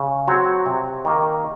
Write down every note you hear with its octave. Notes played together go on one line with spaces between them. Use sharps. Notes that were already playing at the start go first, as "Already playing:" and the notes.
Already playing: C#3
F#3 C4 F#4 C#5
C3
D#3 A#3